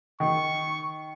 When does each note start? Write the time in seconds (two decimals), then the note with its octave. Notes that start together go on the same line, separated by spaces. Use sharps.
0.20 D#3 C#6